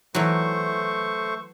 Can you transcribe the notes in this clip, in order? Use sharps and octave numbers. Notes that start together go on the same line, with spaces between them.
E3 F#3 A3 C5 C#6